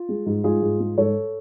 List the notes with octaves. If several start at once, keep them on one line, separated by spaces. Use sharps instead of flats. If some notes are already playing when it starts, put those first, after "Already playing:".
Already playing: F4
G#3
G#2
G#2 F4 G#4
G#2
G#3
G#2 A4 C#5